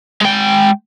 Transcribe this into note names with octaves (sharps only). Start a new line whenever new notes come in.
G#3 G5